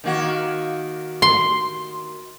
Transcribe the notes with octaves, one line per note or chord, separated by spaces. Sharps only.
D#3 A#3 F#4
C6